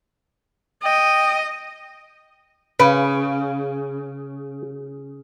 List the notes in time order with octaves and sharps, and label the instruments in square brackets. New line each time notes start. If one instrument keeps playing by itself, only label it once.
[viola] D#5 [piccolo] G5
[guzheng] C#3 [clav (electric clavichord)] B4